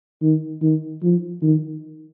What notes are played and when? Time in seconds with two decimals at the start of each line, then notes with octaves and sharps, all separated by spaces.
0.22 D#3
0.62 D#3
1.03 F3
1.42 D#3